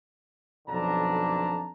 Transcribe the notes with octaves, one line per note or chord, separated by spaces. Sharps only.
B1 F2 D3 D4 A5 A#5